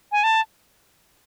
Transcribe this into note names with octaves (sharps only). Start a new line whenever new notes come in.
G#5
A5